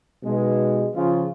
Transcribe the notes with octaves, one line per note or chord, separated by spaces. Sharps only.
B1 B2 G#3
C#3 F3 F4